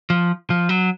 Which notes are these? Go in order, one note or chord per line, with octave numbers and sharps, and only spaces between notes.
F3
F3
F#3